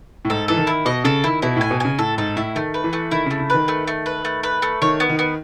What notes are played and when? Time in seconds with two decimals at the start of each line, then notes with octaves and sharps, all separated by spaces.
0.25 A2
0.30 G#2 A4
0.48 E3 A4
0.57 D#3
0.67 E4
0.85 B2 D#5
1.04 C#3 A4
1.24 D#3 E4
1.42 B2 E4
1.56 A2 G#5
1.71 B2
1.80 C#3 G#5
1.99 A2 A4
2.18 G#2 A4
2.36 A2 E4
2.55 D#3 A3
2.74 B4
2.84 E3
2.93 A3
3.11 D#3 E4
3.26 C#3 A3
3.40 C#3
3.50 D#3 B4
3.68 A3
3.87 A3
4.06 B4
4.25 A3
4.43 B4
4.62 A3
4.82 D#3 C#5
5.00 B3
5.09 D#3
5.19 B3